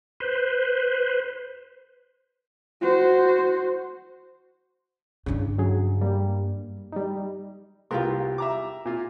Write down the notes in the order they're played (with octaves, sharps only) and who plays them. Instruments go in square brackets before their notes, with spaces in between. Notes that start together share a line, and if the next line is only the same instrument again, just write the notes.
[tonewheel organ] B4 C5
[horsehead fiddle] F#4 C5
[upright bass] G2 D4 [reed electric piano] C#3
[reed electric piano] C#3 F#3 G#4
G3 A#3
G3 D#4
[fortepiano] C2 B3 C6 [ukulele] F4 G4 A#4
[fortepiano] E5 A#5 D6
A#2 F4